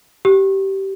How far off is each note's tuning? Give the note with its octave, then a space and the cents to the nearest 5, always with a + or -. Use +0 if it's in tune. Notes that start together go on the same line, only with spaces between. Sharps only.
G4 -20